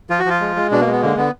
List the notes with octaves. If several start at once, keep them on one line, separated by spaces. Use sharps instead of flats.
F3 F4
F#4
F3 F4
G#3
G#3
B2 D4
A#3
G#3
B3
D3 A#3
D3 B3